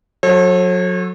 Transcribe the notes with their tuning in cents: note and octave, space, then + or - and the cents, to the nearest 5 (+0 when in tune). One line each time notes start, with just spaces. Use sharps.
F#3 -20 A4 +0 C#5 -45